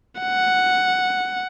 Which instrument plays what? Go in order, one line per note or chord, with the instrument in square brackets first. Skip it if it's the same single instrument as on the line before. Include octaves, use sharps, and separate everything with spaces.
[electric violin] F#5